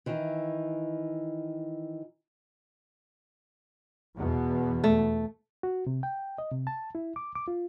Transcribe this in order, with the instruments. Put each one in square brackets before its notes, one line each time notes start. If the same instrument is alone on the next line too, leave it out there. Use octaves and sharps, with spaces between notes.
[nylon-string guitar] D#3 E3
[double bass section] E2 B2
[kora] A3
[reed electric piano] F#4
C3
G5
D#5
C3
A5
E4
D6
D6
F4